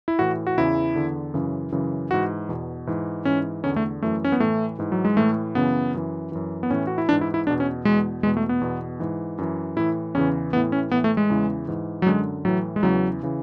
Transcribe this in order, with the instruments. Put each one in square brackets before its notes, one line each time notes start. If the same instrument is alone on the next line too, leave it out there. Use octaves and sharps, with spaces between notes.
[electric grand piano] E4
A2 E3 F#4
F#4
E2 C#3 E3 E4
E2 D3
F#2 C#3 E3
F#2 C#3 E3
G#2 E3 F#4
E2 B2
G#2 E3
G#2 E3 C#4
E2 D3 C#4
A3
F#2 E3 A3
C#4
B3
A2 E3 A3
G#2 E3
F#3
G#3
A2 E3 A3
F#2 C#3 E3 B3
F#2 E3
F#2 E3
B3
A2 E3 C#4
F#4
E4
G#2 E3 D4
E4
E4
E2 D4
B2
C#4
E2 B2 G#3
E2 G#3
B2
A3
B3
E2 B2
G#2 E3
F#2 E3
A2 E3 E4
E2 C#3 E3 C#4
A2 E3 B3
C#4
A2 E3 B3
A3
G#3
E2 C#3 E3
G#2 E3
F#3
F#2 D3 G#3
A2 E3 F#3
G#3
E2 C#3 E3 F#3
C#3 E3